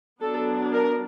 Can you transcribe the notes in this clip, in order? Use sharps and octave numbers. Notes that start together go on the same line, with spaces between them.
F#3 B3 D4 A4
A#4